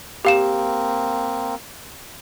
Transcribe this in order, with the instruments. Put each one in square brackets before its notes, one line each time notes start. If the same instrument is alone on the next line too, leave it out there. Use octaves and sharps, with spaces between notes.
[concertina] A#3 C4 [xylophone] G4 F5 E7